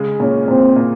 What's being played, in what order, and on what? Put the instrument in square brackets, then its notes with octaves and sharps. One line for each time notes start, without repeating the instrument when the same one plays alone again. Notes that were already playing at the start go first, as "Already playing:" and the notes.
Already playing: [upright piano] C#3 G#3
[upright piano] A#2 [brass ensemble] C#4
[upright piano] A#2 [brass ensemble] C4
[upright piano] A#2